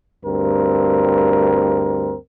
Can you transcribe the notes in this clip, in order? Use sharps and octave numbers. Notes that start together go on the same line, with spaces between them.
D2 G2 C4 A#4